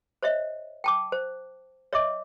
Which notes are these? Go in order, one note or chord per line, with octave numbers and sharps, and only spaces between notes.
C5 C#5 D#5 E5
G5 A5 D6
C5
C#5 D#5 E5 D6